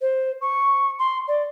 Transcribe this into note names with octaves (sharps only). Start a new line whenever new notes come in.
C5
C#6
C6
D5